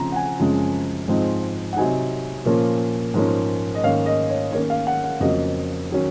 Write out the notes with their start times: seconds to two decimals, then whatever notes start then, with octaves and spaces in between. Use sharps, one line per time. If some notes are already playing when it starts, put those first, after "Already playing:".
Already playing: C#3 F3 C4 A#5
0.12 F#5
0.16 G#5
0.39 F#2 C#3 F3 G#3 C4
1.08 G#2 F3 G#3 C4 D#4
1.73 F#5
1.77 C3 F#3 C4 D#4 G#5
2.45 A#2 F3 A#3 C#4
3.14 G#2 F3 A#3 C#4
3.75 D#5
3.83 G#2 D#3 A#3 C#4 F5
4.06 D#5
4.29 C#5
4.52 D#3 A#3 C#4 C#5
4.70 F5
4.87 F#5
5.04 F#5
5.20 F2 C#3 F#3 A#3 D#5
5.90 D#3 F#3 C#4